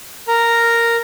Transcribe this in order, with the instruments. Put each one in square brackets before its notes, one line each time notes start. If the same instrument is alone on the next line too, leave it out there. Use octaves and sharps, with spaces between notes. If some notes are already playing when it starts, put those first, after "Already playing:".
[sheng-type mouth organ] A#4 A#5